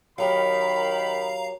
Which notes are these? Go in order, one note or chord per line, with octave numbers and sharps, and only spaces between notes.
D#3 F#3 G4 A#4 F5 A#5 B5